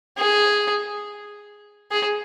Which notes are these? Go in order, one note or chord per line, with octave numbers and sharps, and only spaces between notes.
G#4
G#4